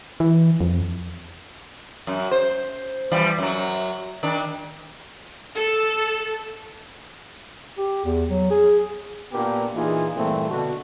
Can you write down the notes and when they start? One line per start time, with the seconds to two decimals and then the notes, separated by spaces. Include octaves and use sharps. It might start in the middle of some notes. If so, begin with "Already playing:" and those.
0.20 E3
0.61 F2
2.07 F#2
2.31 C5
3.12 E3 F3 G3
3.38 F#2 F#3
4.23 D#3 D4
5.56 A4
7.78 G4
8.05 E2
8.30 F#3
8.51 G#4
9.32 A#2 A#3 B3 D4 G4
9.75 A#2 E3 D#4 F4 G#4
10.16 G2 A#2 E3 A3 C4
10.51 B2 D3 F#4